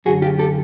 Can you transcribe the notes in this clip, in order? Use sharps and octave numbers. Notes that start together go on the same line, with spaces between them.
F#2 D3 F#4 G#4
F4 G4
G4 A4